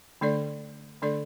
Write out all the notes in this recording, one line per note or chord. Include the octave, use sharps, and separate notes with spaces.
D3 A3 D4 A4 D5
D3 A3 D4 A4 D5